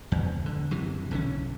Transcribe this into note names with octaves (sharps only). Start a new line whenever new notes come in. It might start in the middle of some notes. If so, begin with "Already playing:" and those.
E2
D3
F#2 C3 E3
B1 D3 D#3 C#4